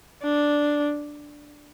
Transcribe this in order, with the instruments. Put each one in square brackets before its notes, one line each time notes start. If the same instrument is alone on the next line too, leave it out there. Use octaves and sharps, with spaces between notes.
[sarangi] D4